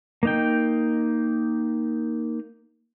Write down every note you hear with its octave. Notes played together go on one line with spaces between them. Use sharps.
A#3 D#4 G5